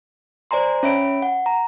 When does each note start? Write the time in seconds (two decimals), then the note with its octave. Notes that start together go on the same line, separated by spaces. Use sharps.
0.51 C5 D5 G#5 A#5 C6
0.83 C#4 C#5 E5 B5 D7
1.22 F#5
1.46 A#5